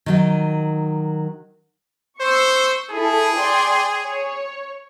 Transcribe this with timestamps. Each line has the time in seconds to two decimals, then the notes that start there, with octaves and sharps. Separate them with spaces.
0.06 D#3 F#3 D#4
2.20 C5 C#6 E6
2.90 E4 G#4 A4
3.38 D5 G5 C6
4.04 C#5